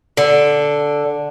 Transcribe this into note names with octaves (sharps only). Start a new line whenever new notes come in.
D3